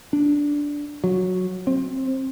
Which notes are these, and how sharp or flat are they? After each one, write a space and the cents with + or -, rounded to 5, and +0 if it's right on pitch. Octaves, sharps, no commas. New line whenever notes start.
D4 -10
F#3 -10
C4 +20